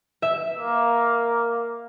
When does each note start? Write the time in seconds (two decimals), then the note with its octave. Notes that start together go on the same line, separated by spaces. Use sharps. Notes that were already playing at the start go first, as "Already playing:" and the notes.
0.22 E5
0.59 A#3